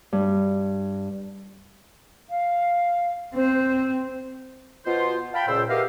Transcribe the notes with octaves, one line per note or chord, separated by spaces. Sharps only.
G2
F5
C4 C5
B2 F4 C5
F5 G5 A5 B5
C#2 A#2 C5 E6
B3 E4 G4 A#4 D#5 F5